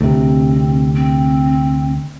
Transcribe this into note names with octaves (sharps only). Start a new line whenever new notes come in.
D2 C3 C4
C4